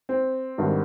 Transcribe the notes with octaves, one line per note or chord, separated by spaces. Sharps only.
C4
G#1 G2 D#3 G3